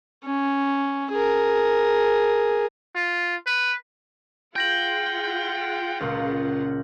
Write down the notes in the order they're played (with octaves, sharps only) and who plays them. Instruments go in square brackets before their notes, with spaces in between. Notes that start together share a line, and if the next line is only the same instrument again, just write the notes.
[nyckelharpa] C#4
G#4 A#4
[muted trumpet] F4
B4
[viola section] F4 G#4 F#5 [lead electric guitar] G5 [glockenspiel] G6 A#6 F#7
[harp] C#2 A#2